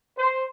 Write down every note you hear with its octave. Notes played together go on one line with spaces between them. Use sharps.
C5